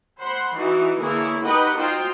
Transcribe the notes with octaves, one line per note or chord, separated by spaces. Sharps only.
C5 F#5 B5 C6
E3 D#4 F#4
D3 E3 A#3 E4 G#4 C#5
D#4 G4 B4 D#5 F#5 G5
D#4 F4 F#4 C5 G5